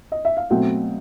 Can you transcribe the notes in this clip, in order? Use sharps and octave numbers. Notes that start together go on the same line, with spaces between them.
D#5
E5
F5
B2 F#3 A3 C4 F#5